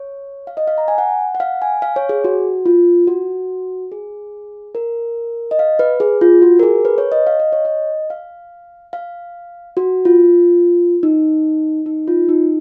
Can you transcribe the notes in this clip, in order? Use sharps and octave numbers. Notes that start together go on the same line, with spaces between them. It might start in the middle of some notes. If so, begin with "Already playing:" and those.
Already playing: C#5
F5
D#5
F5
A#5
G#5
F#5
F#5
F5
G#5
F5
C#5
G#4
F#4
F4
F#4
G#4
A#4
D#5
F5
B4
G#4
F4
F#4
A#4
G#4
B4
C#5
D#5
F5
D#5
C#5
D#5
F5
F5
F#4
F4
D#4
D#4
F4
D#4